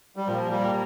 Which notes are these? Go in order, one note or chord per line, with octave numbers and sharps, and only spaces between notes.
G3
A#2 F3
G3
A#3